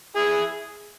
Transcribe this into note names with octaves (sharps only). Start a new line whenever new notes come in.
E4 G#4